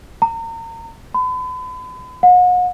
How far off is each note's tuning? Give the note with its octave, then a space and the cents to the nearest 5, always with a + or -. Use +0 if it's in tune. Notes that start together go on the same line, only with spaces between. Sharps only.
A#5 -35
B5 +40
F#5 -40